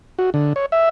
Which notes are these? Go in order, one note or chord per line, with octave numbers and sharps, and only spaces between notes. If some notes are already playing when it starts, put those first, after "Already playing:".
F#4
D3
C#5
E5